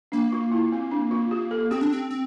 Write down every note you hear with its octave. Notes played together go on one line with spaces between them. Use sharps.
A#3 D4
F4
E4
C4
D4
F4
G4
A4
C4 G4
D4
C4
C4